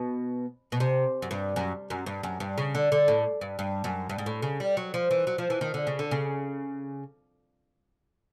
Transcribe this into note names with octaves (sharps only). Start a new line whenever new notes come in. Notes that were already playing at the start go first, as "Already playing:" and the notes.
Already playing: B2
B2
C3
F#2
G2
F#2
F#2
G2
F#2
G2
C#3
D3
D3
A2
G2
G2
F#2
G2
G#2
A2
C#3
G3
F#3
F3
E3
F#3
F3
E3
D#3
D3
C#3
D3
C#3